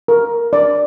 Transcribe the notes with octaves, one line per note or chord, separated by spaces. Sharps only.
A#4
D5